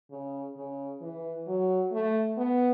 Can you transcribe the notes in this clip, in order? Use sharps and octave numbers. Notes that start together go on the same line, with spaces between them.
C#3
C#3
E3
F#3
A3
B3